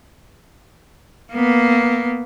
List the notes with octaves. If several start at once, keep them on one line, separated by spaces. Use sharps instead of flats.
A#3 B3